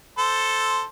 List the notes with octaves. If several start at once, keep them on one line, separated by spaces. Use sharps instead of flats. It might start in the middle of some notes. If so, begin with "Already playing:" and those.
A4 C5